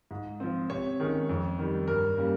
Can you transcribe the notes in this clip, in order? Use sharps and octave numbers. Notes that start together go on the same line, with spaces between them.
G#2
F3 C4
C3 C#5
D#3 G#3 C#4
F2
D#3 G3
G2 A#4
G3 A#3 C#4